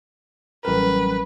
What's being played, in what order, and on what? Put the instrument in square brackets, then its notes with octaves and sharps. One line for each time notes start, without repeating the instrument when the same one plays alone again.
[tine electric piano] A1 A#4 [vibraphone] F#3 G3 C#4 [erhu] B4